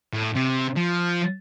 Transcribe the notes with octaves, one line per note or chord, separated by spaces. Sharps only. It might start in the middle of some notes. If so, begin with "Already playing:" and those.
A2
C3
F3